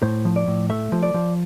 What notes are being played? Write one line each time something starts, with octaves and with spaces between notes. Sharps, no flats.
A2 C5
F3
D5
A2
A3 E5
F3
D5
F3